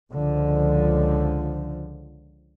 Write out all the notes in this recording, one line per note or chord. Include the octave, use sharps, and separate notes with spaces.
C#2 D3 F3